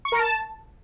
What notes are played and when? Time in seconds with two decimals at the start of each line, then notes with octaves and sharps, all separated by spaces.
0.05 C#6
0.12 A#4
0.19 A5